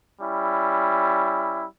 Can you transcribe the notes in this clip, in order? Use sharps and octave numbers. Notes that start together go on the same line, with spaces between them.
G3 C#4 E4